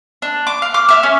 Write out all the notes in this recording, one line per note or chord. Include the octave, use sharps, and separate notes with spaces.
D4
D6
F5
D6 F6
E5 F6
C#4